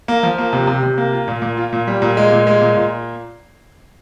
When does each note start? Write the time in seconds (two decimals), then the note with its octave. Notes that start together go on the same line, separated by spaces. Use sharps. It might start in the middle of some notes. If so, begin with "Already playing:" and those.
0.08 A#3
0.23 F3
0.38 A#3
0.53 C3
0.67 C3
0.83 C3
0.98 A#3
1.13 F4
1.28 A#2
1.42 A#2
1.57 F4
1.73 A#2
1.87 G3
2.02 A#2
2.17 G#3
2.32 A#2
2.47 G#3
2.61 A#2
2.77 A#2